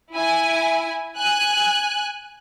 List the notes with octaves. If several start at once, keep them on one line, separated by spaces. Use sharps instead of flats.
E4 G#5
G#5 F#6